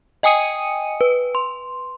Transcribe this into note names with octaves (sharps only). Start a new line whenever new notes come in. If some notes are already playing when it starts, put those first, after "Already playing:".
D#5 G5 G#5 D#6 C#7 D#7
B4
C6